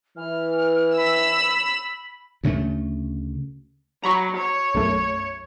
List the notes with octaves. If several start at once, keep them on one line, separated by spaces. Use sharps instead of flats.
E3 F6
B5 E6
D2 C#3 G3 A3
F#3 A#5 B5 C#6
C#5
B1 F#2 A3